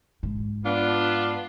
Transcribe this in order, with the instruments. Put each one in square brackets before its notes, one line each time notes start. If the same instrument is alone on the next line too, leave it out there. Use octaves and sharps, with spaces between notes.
[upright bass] G#2
[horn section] B3 D4 [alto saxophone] F4